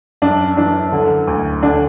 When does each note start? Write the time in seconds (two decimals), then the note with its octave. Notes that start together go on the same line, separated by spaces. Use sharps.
0.22 F#2 D4
0.57 E3 D4
0.92 D3
1.27 D2
1.63 D3 D4